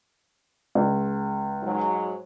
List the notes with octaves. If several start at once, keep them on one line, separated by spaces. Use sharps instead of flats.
C#2
G#2 F#3